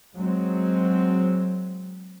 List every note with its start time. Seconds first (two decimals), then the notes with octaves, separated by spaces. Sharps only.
0.14 F#3 G#3 C4